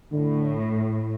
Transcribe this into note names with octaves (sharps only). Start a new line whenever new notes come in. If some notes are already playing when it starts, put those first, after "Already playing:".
A2 D3